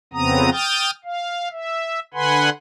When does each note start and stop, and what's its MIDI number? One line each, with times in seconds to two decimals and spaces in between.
0.13 0.50 41
0.13 0.50 49
0.13 0.50 59
0.13 0.50 60
0.13 0.50 82
0.13 0.50 87
0.52 0.91 79
0.52 0.91 87
0.52 0.91 89
0.52 0.91 91
0.52 0.91 93
1.04 1.48 77
1.52 2.00 76
2.14 2.50 50
2.14 2.50 71
2.14 2.50 78
2.14 2.50 80
2.14 2.50 83
2.14 2.50 84